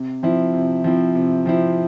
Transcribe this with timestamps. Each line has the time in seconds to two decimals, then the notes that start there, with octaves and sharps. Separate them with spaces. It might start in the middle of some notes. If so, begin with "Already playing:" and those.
Already playing: C3
0.23 F3 C4 E4
0.54 C3
0.84 F3 C4 E4
1.15 C3
1.46 F3 C4 E4